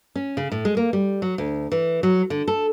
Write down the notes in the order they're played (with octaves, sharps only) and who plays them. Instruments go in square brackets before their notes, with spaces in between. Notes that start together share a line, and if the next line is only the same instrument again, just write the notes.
[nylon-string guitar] C#4
C#3
A2
G#3
A#3
G3
F#3
D2
E3
F#3
D3
A4